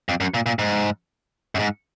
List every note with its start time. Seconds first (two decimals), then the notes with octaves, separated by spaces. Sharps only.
0.09 F2
0.20 F#2
0.34 A#2
0.46 A#2
0.59 G#2
1.55 F#2
1.59 G#2